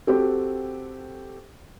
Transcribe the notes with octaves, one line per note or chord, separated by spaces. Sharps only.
C4 F#4 G4 A4